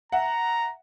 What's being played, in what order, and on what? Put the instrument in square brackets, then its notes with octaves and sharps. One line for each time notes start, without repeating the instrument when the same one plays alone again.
[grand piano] E5 F#5 [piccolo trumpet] A#5